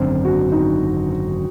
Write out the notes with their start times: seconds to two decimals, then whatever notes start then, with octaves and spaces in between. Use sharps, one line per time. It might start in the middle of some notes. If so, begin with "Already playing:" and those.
Already playing: G#1 F#2 D3 C4
0.25 F#4
0.52 D#4